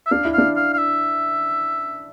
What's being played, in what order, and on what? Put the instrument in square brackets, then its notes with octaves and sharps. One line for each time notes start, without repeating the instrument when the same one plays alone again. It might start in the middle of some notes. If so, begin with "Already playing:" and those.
[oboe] E5
[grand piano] D4 [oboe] F5
[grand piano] E4
[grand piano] D4 [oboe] F5
[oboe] F5
F5
E5